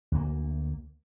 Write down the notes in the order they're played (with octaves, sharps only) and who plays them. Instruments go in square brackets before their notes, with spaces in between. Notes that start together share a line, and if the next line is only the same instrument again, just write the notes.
[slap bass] D2 A#3